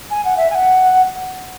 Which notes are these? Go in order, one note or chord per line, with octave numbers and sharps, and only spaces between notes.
G#5
F#5
E5
G#5
F#5